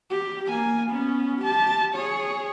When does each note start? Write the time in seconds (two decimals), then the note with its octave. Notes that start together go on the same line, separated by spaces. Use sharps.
0.10 G4
0.49 A#3 G#5
0.90 B3 C#4
1.42 G4 A5
1.95 G#4 C#5